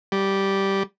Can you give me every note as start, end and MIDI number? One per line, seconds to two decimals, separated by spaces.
0.12 0.83 55